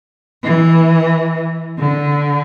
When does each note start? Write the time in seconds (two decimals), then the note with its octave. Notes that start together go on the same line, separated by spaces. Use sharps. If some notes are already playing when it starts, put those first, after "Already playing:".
0.43 E3
1.79 D3